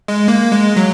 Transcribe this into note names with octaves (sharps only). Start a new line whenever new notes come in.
G#3
A#3
G#3
F#3